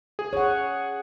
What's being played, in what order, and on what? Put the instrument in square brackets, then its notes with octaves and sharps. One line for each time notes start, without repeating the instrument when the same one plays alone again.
[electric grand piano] G#4
[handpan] C#5 F#5